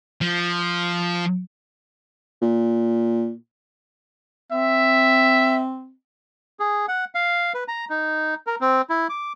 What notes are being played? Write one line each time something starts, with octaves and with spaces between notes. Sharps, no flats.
F3
A#2
C4 E5
G#4
F#5
F5
B4
A#5
D#4
A#4
C4
E4
D6